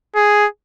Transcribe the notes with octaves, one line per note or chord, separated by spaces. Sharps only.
G#4